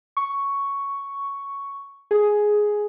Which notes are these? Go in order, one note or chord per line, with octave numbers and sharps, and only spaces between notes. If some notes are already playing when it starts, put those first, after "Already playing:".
C#6
G#4